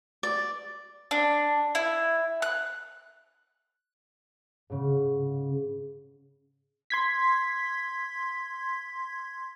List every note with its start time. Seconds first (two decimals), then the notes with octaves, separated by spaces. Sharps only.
0.23 D5
1.11 D4
1.75 E4
2.42 F#6
4.70 G#2 C#3
6.90 C6 G#6 B6